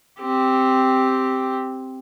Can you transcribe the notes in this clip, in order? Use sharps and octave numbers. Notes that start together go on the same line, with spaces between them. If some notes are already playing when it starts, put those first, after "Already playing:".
C4 G4